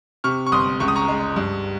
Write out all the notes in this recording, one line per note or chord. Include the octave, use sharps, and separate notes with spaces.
C3 C#6 F6
C#6
G1 C6 D#6
C#2 C#6
D#6
A#5 C#6
G#3
G2